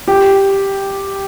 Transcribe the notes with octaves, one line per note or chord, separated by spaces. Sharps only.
G4